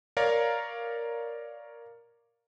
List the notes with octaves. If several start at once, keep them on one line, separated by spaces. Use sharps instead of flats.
A#4 C#5 D5 F5 A#5